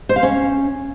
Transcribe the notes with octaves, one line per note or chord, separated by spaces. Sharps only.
C5
F5
C#4